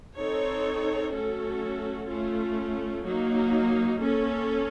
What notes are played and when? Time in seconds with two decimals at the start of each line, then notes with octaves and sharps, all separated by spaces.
0.17 C4 D#4 A4 C#5
1.12 F#3 A3 C#4 F#4 A4
2.08 A3 C#4 F4
3.04 F#3 A#3 D#4
3.99 A#3 C#4 A4